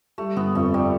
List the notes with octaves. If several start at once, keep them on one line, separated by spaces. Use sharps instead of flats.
G3 A3
G1 B3
F2 A3
G3